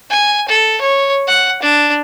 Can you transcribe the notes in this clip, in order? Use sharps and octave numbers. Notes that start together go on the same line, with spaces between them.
G#5
A4
C#5
F#5
D4